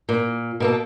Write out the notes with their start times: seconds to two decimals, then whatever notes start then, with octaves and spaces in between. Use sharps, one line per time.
0.09 A#2
0.60 B2 A#3 A4